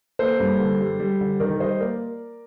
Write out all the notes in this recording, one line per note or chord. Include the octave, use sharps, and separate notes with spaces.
A#3 A4 C5
G2
D3
G3
G3
D3
D#3 A#4 D5
G3 C5 D#5
A#3 A#4 D5